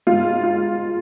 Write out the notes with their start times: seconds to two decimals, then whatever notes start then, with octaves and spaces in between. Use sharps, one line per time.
0.07 G#2 F4
0.43 F4